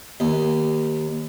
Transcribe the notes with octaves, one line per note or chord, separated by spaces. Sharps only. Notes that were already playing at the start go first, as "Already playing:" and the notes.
D#2